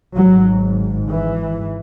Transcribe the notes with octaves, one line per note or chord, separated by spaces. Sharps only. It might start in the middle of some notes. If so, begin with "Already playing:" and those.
G#1 G#2 F#3
E3